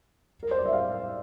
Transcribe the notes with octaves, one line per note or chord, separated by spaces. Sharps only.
A#4
C5
D5
E5
F5